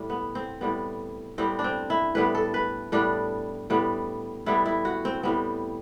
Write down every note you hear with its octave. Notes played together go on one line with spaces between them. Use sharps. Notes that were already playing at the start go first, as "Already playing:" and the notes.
Already playing: A2 G3
B3
C4
A2 G3 B3
A2 G3 B3 C4
D4
C4
E4
A2 G3 B3 B4
A4
B4
A2 G3 B3 D4
A2 G3 B3
A2 G3 B3 E4
E4
F#4
C4
A2 G3 B3 C4